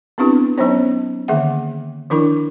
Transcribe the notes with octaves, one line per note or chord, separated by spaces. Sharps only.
B3 C4 D4 E4 G4 B4
F#3 B3 C#4 D#4 C5 C#5
D3 D#3 A#3 G#4 E5 F#5
D#3 F3 D4 E4 A#4 B5